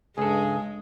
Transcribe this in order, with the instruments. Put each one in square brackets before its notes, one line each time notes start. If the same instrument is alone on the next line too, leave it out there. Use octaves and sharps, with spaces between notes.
[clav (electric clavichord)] C#2 A4 [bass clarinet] G2 [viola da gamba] G#3 [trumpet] G#4